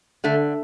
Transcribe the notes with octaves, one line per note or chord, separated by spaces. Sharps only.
D3 A3